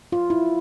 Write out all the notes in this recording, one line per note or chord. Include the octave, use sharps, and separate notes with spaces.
F4
E4